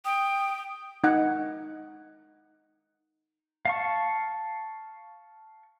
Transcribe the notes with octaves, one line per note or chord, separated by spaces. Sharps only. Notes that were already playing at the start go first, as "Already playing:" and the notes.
G5 D#6
D#4 F#5
F5 A5 C#6